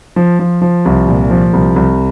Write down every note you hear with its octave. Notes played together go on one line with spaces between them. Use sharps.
F3
F3
F3
C2
A#2
F3
C2
C2